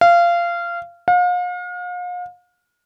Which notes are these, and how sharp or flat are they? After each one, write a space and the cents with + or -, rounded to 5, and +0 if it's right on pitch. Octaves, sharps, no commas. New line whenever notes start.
F5 -20
F5 +40